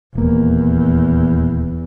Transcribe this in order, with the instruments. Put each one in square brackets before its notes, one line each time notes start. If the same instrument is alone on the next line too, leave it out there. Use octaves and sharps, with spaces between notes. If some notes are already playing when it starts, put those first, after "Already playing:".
[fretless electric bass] D#1 A#3 [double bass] E2